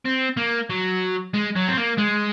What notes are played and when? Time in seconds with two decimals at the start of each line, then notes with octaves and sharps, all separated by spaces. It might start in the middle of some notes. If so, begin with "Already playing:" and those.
0.05 C4
0.37 A#3
0.70 F#3
1.34 G#3
1.56 F#3
1.68 C4
1.77 A#3
1.98 G#3